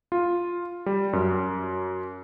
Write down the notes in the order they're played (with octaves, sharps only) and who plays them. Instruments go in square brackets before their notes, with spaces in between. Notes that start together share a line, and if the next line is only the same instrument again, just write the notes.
[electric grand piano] F4
G3
F#2